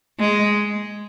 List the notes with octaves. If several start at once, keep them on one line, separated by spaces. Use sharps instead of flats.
G#3